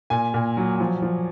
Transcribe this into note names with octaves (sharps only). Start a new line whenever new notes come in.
A#2 G#5
A#2
F#3
F3
F3